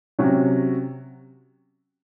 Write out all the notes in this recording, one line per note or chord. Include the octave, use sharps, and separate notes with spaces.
C3 F#3 C#4 F#4